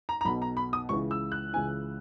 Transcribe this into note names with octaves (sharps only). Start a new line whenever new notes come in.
A#5
A#5
B1 B2 B5
A#5
B5
D#6
C#2 C#3 E3 C#6
E6
F#6
C#2 C#3 E3 G#5